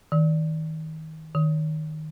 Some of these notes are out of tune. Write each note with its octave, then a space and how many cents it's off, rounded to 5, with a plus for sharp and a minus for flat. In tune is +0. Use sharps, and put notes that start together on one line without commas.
D#3 +25
D#3 -5